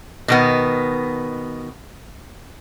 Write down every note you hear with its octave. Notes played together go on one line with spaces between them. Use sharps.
B2 D#3 B3